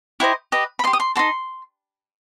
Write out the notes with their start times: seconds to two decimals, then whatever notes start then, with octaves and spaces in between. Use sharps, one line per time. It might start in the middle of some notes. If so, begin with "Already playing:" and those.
0.20 E4 G4 C5 D#5 F#5
0.52 G4 B4 D#5
0.79 B5
0.84 G4 D#5 C6
0.93 D#6
1.00 C6
1.15 D#4 F#4 A4 C6